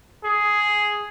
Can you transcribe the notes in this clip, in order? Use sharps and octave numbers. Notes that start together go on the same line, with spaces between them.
G#4